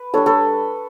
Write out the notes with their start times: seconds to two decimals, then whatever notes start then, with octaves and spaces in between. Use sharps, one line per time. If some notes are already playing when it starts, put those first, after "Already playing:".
Already playing: B4
0.14 G3 D4 A4 C#5
0.26 A4 C#5